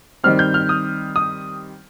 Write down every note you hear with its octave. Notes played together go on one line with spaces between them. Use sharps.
D#3 G3 C4 F6
G6
F6
D#6
D#6